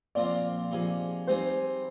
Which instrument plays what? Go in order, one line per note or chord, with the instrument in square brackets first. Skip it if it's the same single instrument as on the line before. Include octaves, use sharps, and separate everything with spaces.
[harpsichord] A#2 F3 C4 F4 A#4 [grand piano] D5
[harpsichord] C3 F3 A#3 D#4 G#4
[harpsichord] G3 C4 D#4 G#4 [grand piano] C5